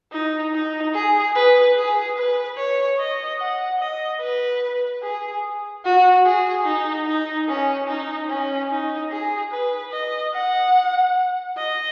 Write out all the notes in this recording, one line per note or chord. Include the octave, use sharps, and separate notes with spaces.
D#4
D#4
G#4
B4
G#4
B4
C#5
D#5
F#5
D#5
B4
G#4
F#4
G#4
D#4
D#4
C#4
D#4
C#4
D#4
G#4
B4
D#5
F#5
D#5